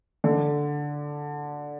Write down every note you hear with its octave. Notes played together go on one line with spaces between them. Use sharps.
D3